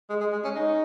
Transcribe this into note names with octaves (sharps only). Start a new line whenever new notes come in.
G#3
G#3
G#3
C#4
D#4